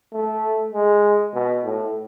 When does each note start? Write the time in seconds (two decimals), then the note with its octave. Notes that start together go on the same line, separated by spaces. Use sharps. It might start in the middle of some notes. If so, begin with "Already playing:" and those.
0.13 A3
0.73 G#3
1.34 B2
1.64 A2